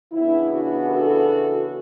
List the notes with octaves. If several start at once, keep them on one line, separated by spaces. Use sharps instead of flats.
C#3 E3 B3 D4 E4
F#4
F#4 A4